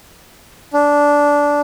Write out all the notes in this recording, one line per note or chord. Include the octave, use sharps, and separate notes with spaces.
D4